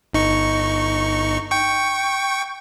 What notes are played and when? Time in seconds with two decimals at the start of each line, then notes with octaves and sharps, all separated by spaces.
0.13 G1 D#4 C#6
1.51 G5 C#6